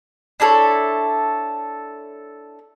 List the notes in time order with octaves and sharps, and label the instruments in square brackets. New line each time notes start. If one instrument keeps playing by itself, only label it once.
[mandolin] D4 E4 A4 C#5